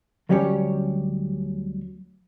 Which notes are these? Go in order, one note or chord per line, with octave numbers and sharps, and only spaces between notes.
D2 F#3 G3 C#4 G4 C#5